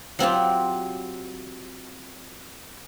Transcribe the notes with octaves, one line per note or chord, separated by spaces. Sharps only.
F#3 C4 F4 G4